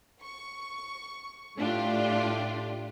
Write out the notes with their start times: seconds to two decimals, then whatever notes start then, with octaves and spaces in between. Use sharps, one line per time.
0.22 C#6
1.57 A2 A3 D4 F4 G4